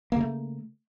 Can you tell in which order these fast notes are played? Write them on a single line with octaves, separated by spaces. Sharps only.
A#3 C#3 A3